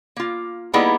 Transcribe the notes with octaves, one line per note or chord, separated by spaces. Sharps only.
A#3 F4
G3 A#3 B3 D#4 E4 G#4